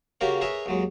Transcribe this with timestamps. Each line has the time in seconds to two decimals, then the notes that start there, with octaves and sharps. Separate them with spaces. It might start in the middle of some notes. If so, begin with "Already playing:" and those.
0.21 C#3 A#3 F#4 G4 A#4 C#5
0.41 G#4 A#4 B4 C#5 E5
0.66 D#2 F#3 G#3